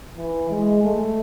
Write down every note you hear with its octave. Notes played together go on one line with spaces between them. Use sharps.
E3
G#3
A3